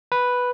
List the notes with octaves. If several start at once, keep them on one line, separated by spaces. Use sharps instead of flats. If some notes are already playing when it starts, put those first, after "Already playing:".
B4